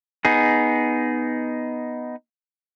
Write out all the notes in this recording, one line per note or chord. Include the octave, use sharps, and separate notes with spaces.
B3 D#4 G#4